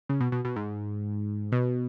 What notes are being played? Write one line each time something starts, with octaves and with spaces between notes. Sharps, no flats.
C#3
B2
B2
B2
G#2
B2